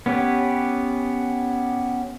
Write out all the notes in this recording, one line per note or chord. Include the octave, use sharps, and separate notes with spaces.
B3 C#4 G4 B4